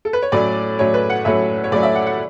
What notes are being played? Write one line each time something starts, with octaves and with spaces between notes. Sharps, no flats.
A4
B4
C#5
A2 F#3 A3 C#4 D5
A2 F#3 A3 C#4 C#5
B4
F#5
A2 F#3 A3 C#4 E5
C#5
A2 F#3 A3 C#4 D5
E5
F#5
F#5